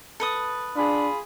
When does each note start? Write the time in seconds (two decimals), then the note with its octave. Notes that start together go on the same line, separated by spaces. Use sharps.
0.20 A4 B4 D#6
0.76 D4 F4 G#4 B5